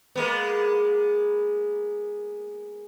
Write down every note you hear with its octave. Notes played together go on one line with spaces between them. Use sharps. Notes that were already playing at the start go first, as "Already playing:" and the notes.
G#3 A#3 B3